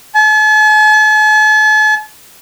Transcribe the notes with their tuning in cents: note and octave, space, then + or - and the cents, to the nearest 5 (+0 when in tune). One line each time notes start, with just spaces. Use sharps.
A5 -45